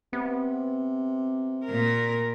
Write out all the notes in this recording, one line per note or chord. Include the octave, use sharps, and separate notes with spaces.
C3 B3
A#2 A#4